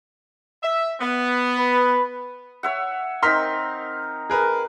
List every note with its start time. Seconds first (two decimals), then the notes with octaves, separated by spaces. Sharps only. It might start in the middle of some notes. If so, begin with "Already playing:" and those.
0.63 E5
1.01 B3
1.59 B4
2.63 C#5 E5 F#5
3.23 C4 D#4 A#4 C6 F6 B6
4.30 G#4 A#4 B4